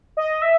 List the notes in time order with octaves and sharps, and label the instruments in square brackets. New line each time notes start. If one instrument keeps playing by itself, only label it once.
[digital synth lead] D#5
E5